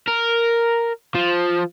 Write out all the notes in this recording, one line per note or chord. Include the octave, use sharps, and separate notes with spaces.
A#4
F3